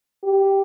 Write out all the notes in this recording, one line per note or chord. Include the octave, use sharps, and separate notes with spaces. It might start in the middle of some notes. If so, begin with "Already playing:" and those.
G4